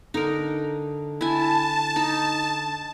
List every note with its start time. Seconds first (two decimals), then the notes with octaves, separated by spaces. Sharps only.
0.14 D3 D#4 A#4
1.21 E4 G#5 A5
1.96 D#4